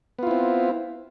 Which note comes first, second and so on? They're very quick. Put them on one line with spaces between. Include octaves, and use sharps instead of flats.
B3 F4 E4 C4